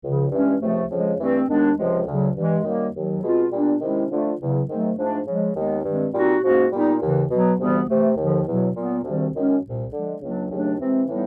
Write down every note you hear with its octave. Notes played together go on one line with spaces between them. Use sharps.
C#2 C#3 F3
G2 E3 G#3 C#4
C#2 C3 F3 A3
F2 C#3 F3 G#3
G2 E3 A3 C4
D#2 D#3 G#3 B3 D4
C#2 C3 F3 G#3
D2 C#3 F#3
G2 E3 G#3
F#2 D#3 G3 A#3
D#2 D#3 F#3
B2 G#3 C4 F4
A#2 G3 B3 D4
C3 D#3 G#3 C#4 E4
D3 F3 A3 D4 F4
E2 C#3 F#3
G#2 D#3 F#3 A3 C4
G#2 F3 A3 D4
C#3 F3 G#3
D#2 D#3 G#3 B3 D#4
G2 D#3 G#3 C4
A#2 G3 C4 D#4 F#4
G#2 F3 A#3 C#4 F#4
A#2 G3 B3 D#4
D#2 C#3 E3
B2 F#3 B3
D2 C3 E3 G3 B3
C3 E3 A3
D#2 D3 F3
E2 B2 F#3
A#2 F#3 B3
D2 C3 D#3 G3 C4
F#2 D#3 G#3 C#4
C2 A#2 G3
D3 F3 G#3
C#2 C#3 F#3 A#3 D4
D#2 C#3 F#3 A3 D4
C3 E3 G#3 C4
A2 E3 G3 B3 D#4